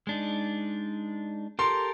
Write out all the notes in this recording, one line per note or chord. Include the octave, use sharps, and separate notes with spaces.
G#3 D4 D#4
G4 A4 A#4 C6